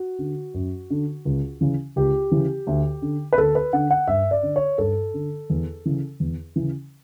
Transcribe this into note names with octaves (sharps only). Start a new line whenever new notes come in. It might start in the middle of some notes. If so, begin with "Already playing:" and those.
Already playing: F#4
D3
F#2
D3
C#2
C#3 E3
C#2 G4
C#3 E3
D2
D3
B4
D2 A4
B4
D3 F#5
F#5
G2 E5
D5
D3
C#5
G2 A4
D3
E2
C#3 E3
E2
C#3 E3